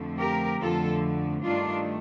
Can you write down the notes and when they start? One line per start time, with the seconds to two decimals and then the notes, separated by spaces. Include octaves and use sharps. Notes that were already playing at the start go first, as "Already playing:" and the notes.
Already playing: F2 D3 F3 A3
0.19 G4 A#4
0.60 F2 D3 F3 A3 F4 A4
1.41 G2 D#3 A3 D4 F4